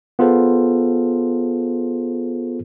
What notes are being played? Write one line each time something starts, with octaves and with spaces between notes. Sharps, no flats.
B3 F4 G#4 A4 C5